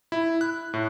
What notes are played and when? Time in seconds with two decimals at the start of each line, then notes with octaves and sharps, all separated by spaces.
0.12 E4
0.41 F#6
0.74 A2